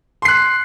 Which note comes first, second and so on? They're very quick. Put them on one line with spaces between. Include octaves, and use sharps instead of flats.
C6 C7 F#6